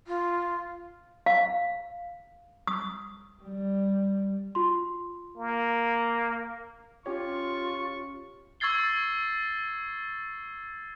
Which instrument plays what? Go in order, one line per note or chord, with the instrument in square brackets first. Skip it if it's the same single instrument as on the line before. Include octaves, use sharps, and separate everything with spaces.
[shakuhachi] F4
[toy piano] F5
D#6
[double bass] G3
[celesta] F4 C6
[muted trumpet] A#3
[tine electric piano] C#4 G4 C#5 [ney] F4 [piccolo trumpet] C#6
[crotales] C#6 E6 G#6 A6 C7 G7